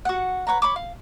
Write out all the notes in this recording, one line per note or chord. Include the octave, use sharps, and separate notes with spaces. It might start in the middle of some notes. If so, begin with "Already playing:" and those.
F#4 F#5
B4 C#5 F#5 A#5
C#5 B5 C#6 D6
F5